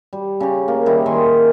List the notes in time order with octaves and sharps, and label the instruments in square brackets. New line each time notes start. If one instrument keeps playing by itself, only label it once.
[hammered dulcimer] G3
C#3 G4
A#3
D#3 G3 E4
D#3 G#5 C6